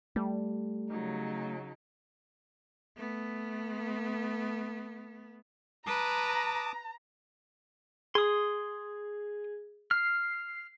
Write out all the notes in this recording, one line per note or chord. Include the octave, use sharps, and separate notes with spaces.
G3 A3
C#3 F#3 D#4
A3 B3
B4 A5 A#5 D6 D#6
G#4 C6 D#6
F6 C7